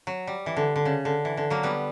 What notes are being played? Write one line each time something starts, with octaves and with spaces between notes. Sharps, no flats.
F#3
G3
E3
D3
D3
C#3
D3
E3
D3
F#3 A#3
G3 B3